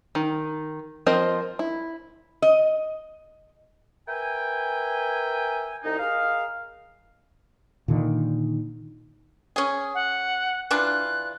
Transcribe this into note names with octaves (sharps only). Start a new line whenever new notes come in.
D#3
F3 C4 A#4 C5 D#5
E4
D#5
A#4 B4 E5 G5 G#5
C2 D#4
G#4 A#4 D#5 F5
A#2 D3 D#3
C#4 G#4
F#5
E3 D4 F4 F#6